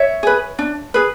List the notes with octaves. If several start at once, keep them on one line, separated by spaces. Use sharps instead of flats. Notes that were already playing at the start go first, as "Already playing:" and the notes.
Already playing: C#5 E5
G#4 B4
D4
G#4 B4